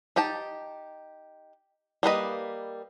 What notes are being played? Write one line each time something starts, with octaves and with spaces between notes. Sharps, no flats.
D#4 G4 G5 A5
G3 A#3 B4 D#5